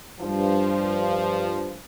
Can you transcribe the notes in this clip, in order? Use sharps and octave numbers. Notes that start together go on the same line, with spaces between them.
G2 F3